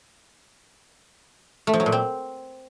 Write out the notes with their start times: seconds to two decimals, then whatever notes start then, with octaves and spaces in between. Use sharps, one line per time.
1.67 A3
1.73 F3
1.80 F#3
1.86 A#2
1.92 C4